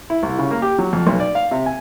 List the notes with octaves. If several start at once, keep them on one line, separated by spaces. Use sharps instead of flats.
E4
C2
C#3
A#3
G4
F#3
F2
B1
D5
F5
C3
G#5